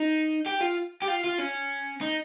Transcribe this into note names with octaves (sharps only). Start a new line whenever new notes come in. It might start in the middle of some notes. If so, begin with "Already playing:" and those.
Already playing: D#4
G4
F4
G4
F4
F4
C#4
D#4